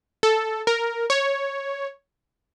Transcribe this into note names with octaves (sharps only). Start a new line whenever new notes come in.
A4
A#4
C#5